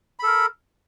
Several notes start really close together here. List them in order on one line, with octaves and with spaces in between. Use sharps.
B5 A4 A#4